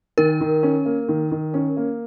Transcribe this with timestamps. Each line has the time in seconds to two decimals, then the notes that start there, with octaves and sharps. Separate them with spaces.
0.18 D#3 A#4
0.40 D#3
0.63 C#4
0.85 A#3
1.08 D#3
1.31 D#3
1.54 C#4
1.77 A#3